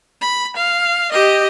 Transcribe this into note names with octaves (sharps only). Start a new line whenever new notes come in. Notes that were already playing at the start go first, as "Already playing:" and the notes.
B5
F5
G4 D#5